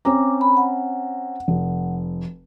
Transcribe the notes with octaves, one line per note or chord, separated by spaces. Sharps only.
C4 C#4 A#5 D6
B5
F#5
F1